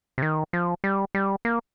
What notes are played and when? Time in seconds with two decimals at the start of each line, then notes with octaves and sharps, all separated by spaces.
0.18 C3
0.22 D#3
0.53 F3
0.84 G3
1.15 G3
1.45 A#3